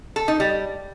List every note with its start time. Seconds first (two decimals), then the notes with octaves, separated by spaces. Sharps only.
0.16 A4
0.28 D#4
0.40 G3